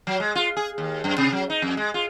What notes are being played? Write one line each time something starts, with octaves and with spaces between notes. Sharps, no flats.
F#3
G#3
F4
G#4
D#2
F#2
C3
F#3
D#4
F2
G#3
F4